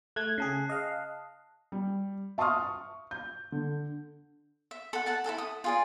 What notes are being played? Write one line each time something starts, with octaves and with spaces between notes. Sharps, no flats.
A3 F#6 G#6
C#3 G#4 A5 C7
D#5 F5
G3
E5 A5 C6 C#6 D#6 F6
C#6
G6
D3
E5
A4 F#5
A4 F#5 A5
E4 F#4 A4 A5
D#6
F4 G#4 D5